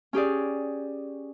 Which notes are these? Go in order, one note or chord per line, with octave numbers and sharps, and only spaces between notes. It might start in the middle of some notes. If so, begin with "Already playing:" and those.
C#4 G4 G#4 D5